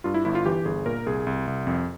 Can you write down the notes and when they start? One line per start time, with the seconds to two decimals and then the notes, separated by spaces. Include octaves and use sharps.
0.04 G2 F4
0.14 E4
0.25 G1 E4
0.35 F4
0.46 E3 G4
0.65 G1 G#4
0.86 A#2 A#4
1.06 C2 G#4
1.27 C2
1.47 C2
1.67 F2